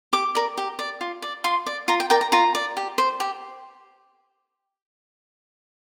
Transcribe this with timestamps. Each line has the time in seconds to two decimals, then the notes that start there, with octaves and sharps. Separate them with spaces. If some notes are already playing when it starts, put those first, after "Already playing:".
0.13 G4 D6
0.35 A#4 D5
0.57 G4
0.79 D5
1.01 F4
1.22 D5
1.44 F4 C6
1.66 D5
1.88 F4 A#5
2.00 G5
2.10 A#4 D5 G5
2.21 A#5
2.32 F4 A#5
2.55 D5
2.77 G4
2.98 C5
3.20 G4